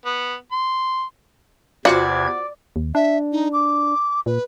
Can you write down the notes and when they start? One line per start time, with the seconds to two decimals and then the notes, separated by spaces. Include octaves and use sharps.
0.05 B3
0.52 C6
1.85 E2 C3 F4 F#4 C5 D5 F#5 G#6
2.76 D#2
2.95 D4 E5
3.32 D#4
3.53 D6
4.26 A#2 B4